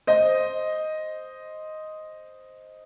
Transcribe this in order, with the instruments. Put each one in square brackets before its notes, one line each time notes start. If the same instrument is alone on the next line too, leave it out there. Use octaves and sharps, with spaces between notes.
[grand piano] C5 D#5